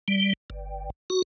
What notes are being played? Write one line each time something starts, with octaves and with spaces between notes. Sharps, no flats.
G3
G1
F#4